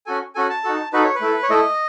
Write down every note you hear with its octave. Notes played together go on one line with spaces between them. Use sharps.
C#4 F#4 A4 G#5
C#4 F#4 A4 G#5
A5
D#4 F#4 A4
D#4 F#4 A4 B4
C#5
B4
A3 E4 A4
C#5
A3 E4 A4 D#5